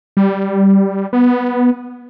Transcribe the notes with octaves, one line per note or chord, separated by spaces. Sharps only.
G3
B3